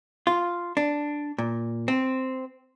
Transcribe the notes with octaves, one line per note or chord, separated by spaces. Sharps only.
F4
D4
A#2
C4